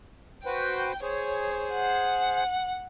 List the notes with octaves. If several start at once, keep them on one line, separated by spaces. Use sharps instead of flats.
F#4 B4 C5 G5
G#4 C5 C#5
F#5